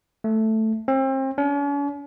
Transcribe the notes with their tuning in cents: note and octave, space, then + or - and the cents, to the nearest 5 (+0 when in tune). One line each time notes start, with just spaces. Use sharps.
A3 +0
C4 +35
C#4 +45